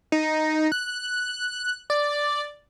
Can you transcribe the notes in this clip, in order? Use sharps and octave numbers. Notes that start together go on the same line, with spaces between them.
D#4
F#6
D5